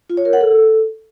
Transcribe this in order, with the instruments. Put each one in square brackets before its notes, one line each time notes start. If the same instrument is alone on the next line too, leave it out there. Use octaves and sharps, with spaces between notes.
[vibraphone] F4
C#5
A#4
F#5
A4